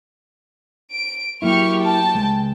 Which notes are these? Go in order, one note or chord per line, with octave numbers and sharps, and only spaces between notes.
D7
F#3 A#3 E4 G4 C#6 F6
G5 A5
C#2 G#3